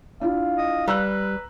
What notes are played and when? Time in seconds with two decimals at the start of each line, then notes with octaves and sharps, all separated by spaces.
0.21 D4 E4 F4 F5
0.58 D#5
0.88 G3 B4 A#5 E6 F#6